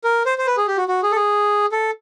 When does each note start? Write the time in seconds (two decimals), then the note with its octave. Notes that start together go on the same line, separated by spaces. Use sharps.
0.04 A#4
0.26 C5
0.38 C5
0.47 B4
0.57 G#4
0.68 G4
0.77 F#4
0.88 F#4
1.03 G#4
1.12 A4
1.16 G#4
1.72 A4